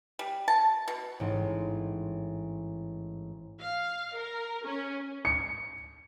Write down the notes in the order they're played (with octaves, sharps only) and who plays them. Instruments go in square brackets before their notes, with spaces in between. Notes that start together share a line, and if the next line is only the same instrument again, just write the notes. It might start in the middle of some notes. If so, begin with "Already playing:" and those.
[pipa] G3
A5
B2
[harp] A1 G#2
[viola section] F5
A#4
C#4
[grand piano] C#7